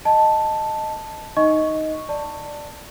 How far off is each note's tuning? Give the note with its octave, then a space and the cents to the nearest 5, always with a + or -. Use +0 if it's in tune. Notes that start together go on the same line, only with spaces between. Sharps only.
D#5 +0 A5 +0
D#4 +0 D#5 +10 C#6 +0
D5 +0 A5 +20